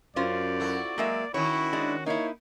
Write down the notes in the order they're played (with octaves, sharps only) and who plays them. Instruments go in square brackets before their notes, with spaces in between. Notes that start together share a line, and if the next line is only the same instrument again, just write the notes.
[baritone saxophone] F#2 [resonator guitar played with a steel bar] C#4 F4 C5 [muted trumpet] D5
[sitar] E4 F#4 A4
[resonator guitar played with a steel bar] F#3 G#3 E5 [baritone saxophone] A#3
[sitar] D#3 C#4 [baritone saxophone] E4 [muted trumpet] F#4 [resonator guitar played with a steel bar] C#5
[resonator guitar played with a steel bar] G#3 D4
[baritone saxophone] A#3 [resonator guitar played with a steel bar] D#4 E4 [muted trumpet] C#5